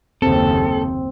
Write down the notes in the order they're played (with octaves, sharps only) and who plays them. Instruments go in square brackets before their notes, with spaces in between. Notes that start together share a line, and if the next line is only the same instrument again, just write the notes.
[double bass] F#1 D#2 [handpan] C4 [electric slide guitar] A4